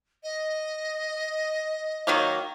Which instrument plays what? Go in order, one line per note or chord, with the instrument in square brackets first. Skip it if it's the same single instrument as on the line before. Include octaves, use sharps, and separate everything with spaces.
[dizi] D#5
[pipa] D#3 F#3 A#3